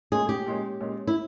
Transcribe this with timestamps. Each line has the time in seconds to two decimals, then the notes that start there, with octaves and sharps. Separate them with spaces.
0.12 A#2 G#3 C#4 G#4
0.29 G4
0.46 A#2 G#3 C#4
0.81 A#2 G#3 C#4
1.07 E4